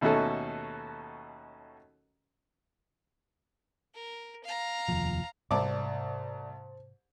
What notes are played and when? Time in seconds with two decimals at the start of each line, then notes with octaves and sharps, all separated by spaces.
0.01 D#2 B2 A3 C#4 F#4 A4
3.94 A#4
4.44 F5 A#5
4.88 F1 D#2 F3
5.51 C2 G#2 C3 A3 C5 D5 A5 D6